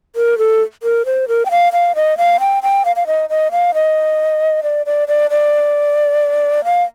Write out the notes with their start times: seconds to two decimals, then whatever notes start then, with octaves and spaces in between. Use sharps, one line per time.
0.16 A#4
0.38 A4
0.83 A#4
1.06 C5
1.28 A#4
1.46 G5
1.51 F5
1.73 F5
1.95 D#5
2.18 F5
2.40 G5
2.63 G5
2.85 F5
2.96 F5
3.07 D#5
3.30 D#5
3.51 F5
3.74 D#5
4.63 D5
4.86 D5
5.08 D5
5.31 D5
6.64 F5